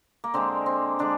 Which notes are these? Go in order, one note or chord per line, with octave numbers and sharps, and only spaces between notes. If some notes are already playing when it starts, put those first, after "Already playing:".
A#3
D3 G#3 C4
C4
D3 G#3 D4